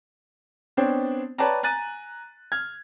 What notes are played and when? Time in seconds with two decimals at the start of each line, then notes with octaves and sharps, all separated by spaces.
0.77 B3 C4 D4 C5 C#5 G5
1.38 B4 C#5 D5 G5 A5 A#5
1.63 G#5 A#5 F#6 A6 D#7
2.52 F6 G#6